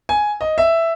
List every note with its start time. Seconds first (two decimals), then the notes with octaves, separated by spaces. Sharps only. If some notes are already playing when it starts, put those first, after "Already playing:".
0.09 G#5
0.41 D#5
0.58 E5